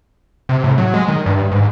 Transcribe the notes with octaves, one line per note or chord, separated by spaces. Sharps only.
C3
A2
F#3
G#3
D#3
G2
G#2